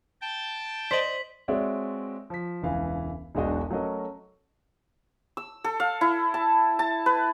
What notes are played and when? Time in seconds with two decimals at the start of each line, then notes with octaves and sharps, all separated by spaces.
0.21 G5 A5
0.91 C5 D5 D#5 B6 F#7
1.48 G#3 C4 F#4 C#5 D5 E5
2.30 F3 B6
2.62 E1 C#2 E3 F5 G#5
3.35 E1 B1 G#3 D4 F#4 D#5
3.71 F#3 A3 C#4 F#4 A#4 D#5
5.37 E6
5.64 A4
5.80 F5
6.01 E4
6.34 A5
6.79 A5
7.06 B4